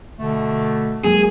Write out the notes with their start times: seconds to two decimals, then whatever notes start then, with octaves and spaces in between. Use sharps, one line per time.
0.19 B2 D3 A3
1.04 F#3 G#3 A#3 G#4